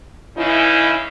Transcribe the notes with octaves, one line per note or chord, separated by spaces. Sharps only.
C#3 E3 D#4 E4